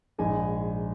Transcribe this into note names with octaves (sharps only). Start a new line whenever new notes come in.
A#1 G#2 D#3 G#3 D#5 G#5